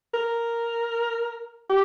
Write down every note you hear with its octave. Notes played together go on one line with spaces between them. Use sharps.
A#4
G4